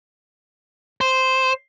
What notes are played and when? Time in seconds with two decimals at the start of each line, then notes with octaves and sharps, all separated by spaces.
1.01 C5